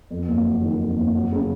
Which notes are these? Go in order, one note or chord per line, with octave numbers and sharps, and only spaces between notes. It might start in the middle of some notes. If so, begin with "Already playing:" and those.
F2
F#1
F#3
D#3
F2
F#1
F#3
C#3